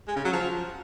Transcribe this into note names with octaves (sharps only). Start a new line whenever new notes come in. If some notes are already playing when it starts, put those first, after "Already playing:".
G#3
C#3
F#3
F3